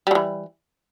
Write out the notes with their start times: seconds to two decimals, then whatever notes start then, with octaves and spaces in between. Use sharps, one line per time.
0.07 G3
0.11 F#3
0.15 E3